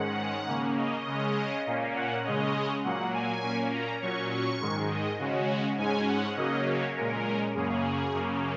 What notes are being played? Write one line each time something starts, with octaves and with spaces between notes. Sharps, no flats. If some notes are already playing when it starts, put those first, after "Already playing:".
Already playing: G#2 D#3 G#3 C#4 F#5
C#3 A#3 C#4
D#5
C#3 G#3 C#4
A#2 A#3 C#4
F#5
C#3 G#3 C#4 D#5
A#2 F#3 A#3 F#5
G#5
A#2 A#3 C#4
A#5
A#2 F#3 C#4 C#6
C#6
G#2 D#3 G#3
D#5
C#3 G#3 C#4 F#4
G#2 G#3 C#4 G#5
F#5
C#3 F#3 A#3 C#4 D#5
C#5
A#2 G#3 C#4 A#4
F#2 C#3 A#3 C#4 G#4
F#2 C#3 A#3 C#4